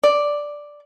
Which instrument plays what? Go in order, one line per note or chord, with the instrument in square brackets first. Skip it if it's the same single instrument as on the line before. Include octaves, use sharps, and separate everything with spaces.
[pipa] D5